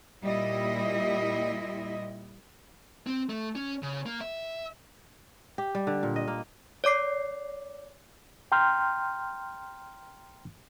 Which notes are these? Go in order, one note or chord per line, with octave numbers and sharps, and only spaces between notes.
A#2 G3 E4 D#5
C4
A3
C#4
C#3
A#3
E5
G4
G3
D3
A#2
D#5
A#3
C#5 D5 D6 C7
G5 A#5 C6 F6 G6